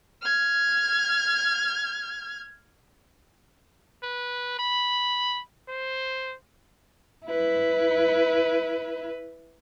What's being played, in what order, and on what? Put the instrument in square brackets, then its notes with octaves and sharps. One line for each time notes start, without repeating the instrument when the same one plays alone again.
[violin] F6 G#6
[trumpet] B4
B5
C5
[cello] E4 B4